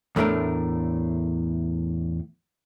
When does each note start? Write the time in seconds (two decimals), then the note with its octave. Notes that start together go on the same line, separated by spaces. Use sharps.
0.16 E2 A2 A3 D4 A#4